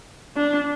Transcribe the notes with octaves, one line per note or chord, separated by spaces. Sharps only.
D4